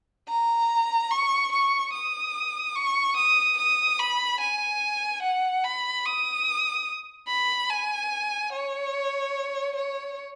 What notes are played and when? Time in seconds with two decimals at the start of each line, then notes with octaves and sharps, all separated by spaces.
0.28 A#5
1.11 C#6
1.52 C#6
1.93 D#6
2.75 C#6
3.16 D#6
3.58 D#6
3.99 B5
4.40 G#5
5.22 F#5
5.64 B5
6.05 D#6
7.28 B5
7.69 G#5
8.52 C#5
9.76 C#5